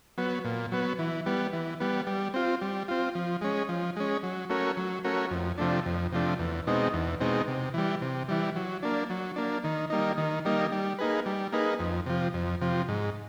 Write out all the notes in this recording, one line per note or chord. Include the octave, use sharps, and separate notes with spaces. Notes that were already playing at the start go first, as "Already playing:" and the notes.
F#3 B3
A#2
F#3 B3
E3
G3 B3
E3
G3 B3
G3
C4 F4
G3
C4 F4
F3
G#3 C#4
F3
G#3 C#4
F#3
A3 C#4 F#4 A#4
F#3
A3 C#4 F#4 A#4
F2
C3 F3 A3 D4
F2
C3 F3 A3 D4
E2
B2 G#3 C4 D#4
E2
B2 G#3 C4 D#4
C3
E3 G3
C3
E3 G3
F#3
A#3 D4
F#3
A#3 D4
D#3
G3 A#3 D#4
D#3
G3 A#3 D#4
G3
A#3 D#4 G#4 B4
G3
A#3 D#4 G#4 B4
F2
C3 F3
F2
C3 F3
G#2